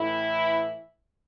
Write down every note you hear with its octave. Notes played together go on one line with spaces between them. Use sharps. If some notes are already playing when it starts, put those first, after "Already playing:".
Already playing: A2 E3 E4